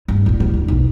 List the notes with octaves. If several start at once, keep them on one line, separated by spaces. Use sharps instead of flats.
G2
A1 A#2
D1
D#2
B1